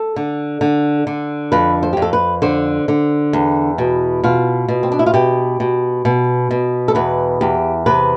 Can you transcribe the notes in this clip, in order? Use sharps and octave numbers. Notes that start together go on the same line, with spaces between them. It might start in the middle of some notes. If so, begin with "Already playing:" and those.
Already playing: A4
D3
D3
D3
F2 B4
C5
F2 G4
A4
B4
D3 C5
D3
E2
B2
B2 F4
B2
C4
D4
E4
F4
B2 G4
B2
B2
B2
A4
E2 B4
E2 G4
C3 B4